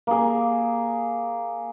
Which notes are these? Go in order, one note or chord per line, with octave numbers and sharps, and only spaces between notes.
A#3 G#4